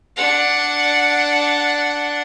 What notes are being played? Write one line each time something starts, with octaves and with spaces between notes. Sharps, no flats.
D4 F#5